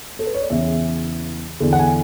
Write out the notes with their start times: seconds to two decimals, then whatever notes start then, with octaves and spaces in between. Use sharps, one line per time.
0.19 A4
0.27 B4
0.34 C#5
0.42 D5
0.50 E2 C#3 E3 E5
1.60 E2 D3
1.73 F#5
1.79 G#5